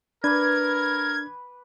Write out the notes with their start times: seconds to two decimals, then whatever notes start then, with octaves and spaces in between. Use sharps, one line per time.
0.24 D4 A#4 B4 D6 G#6